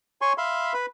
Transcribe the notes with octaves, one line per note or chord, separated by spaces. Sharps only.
C#5 G#5 C6 C#6
E5 F5 B5 C6
B4 B5